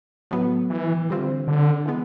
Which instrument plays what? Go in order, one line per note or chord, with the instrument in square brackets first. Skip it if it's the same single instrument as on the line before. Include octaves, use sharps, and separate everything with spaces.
[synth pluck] A2 F#3 B3
[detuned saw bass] E3
[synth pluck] D3 G3 C4 F4
[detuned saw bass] D3
[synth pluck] E3 G#3 B3